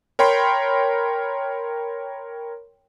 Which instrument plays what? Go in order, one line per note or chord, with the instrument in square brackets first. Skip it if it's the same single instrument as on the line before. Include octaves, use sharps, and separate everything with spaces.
[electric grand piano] A#4 C#5 G5 B5 C6